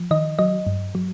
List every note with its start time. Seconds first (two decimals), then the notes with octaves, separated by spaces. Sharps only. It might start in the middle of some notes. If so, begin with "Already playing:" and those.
Already playing: F3
0.11 D#3 D#5
0.39 F#3 D#5
0.67 G2
0.95 F#3